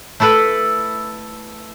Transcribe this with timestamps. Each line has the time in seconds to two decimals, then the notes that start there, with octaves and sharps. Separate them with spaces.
0.20 A3 E4 A4 B4